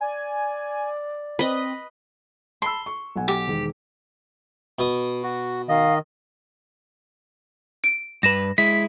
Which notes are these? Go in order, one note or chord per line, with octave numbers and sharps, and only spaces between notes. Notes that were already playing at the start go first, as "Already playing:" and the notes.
D5 G#5
C4 B4 D#5
A5 B5 C6 E6
C#6
B1 F#5 G#5
G4
E1 D#3 G#4
B2 D#6
F#4
D#3 D#5 F5
D7
G2 B4 A#6 E7
G#3 E4 B6